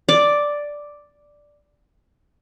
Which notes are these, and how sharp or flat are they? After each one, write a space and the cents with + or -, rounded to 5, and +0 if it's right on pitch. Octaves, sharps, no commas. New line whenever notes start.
D5 +0